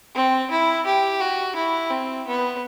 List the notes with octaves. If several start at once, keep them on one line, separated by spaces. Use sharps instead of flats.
C4
E4
G4
F#4
E4
C4
B3